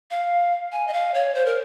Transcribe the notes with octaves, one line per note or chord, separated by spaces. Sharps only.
F5
G#5
D#5
F5
C#5
C5
A#4